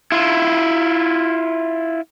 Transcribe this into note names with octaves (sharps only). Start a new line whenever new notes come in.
E4 F4